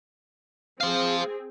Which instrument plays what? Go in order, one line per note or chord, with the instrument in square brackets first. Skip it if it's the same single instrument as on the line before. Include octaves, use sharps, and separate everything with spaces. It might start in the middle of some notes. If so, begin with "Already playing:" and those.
[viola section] C4 G#4 [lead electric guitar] C5 F5